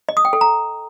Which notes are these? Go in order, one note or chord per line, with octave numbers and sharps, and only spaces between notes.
D#5
D#6
G5
A4
A#5